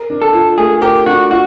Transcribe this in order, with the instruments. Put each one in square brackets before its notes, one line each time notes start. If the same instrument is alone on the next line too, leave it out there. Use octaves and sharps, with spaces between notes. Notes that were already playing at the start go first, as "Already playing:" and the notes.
Already playing: [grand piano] A#4
D4
[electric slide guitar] A4
[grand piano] F4
[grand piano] A3 [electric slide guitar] G#4
[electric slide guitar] G4 [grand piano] A#4
[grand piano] D4 [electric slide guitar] F#4
[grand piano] F4 [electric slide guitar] F#4